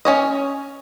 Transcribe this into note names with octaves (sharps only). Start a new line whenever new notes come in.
C#4 C#5 D#5